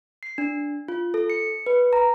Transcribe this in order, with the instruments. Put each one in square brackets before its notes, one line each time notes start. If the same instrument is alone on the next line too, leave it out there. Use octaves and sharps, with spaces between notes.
[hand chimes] C7
D4
F4
A4
C#7
B4
A#5